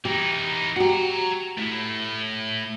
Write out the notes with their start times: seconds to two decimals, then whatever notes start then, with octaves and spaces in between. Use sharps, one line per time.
0.05 E3 D#4 G4
0.76 F#4 G4 F#5 A#5
1.58 A3 E4